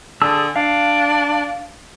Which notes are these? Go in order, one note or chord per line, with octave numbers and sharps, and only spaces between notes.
D3 G#4 A5 E6
D4 F5